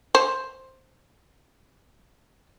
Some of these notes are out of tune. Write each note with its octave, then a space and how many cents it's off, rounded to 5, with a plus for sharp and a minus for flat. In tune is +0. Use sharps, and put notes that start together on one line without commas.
C5 +5